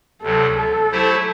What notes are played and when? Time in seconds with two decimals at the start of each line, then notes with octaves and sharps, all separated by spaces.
0.22 D2 C3 F#3 A4
0.56 A4
0.91 F#3 A3 E4 G4 C5